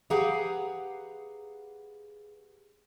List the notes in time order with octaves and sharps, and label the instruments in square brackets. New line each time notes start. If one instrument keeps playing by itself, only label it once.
[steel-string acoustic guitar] G4 G#4 B4 F5 F#5 A#5